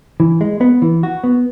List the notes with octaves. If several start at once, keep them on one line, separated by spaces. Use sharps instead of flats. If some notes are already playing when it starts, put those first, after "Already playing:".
E3
G#3
B3
E3
F#4
B3